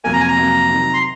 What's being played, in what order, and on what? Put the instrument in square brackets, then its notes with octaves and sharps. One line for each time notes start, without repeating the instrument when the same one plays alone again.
[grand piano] F2 C3 F#3 A#3 [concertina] G#5
[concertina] A#5
G#5
A#5
[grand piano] F2 C3 F#3 A#3
C3 D#3 F#3
[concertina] C6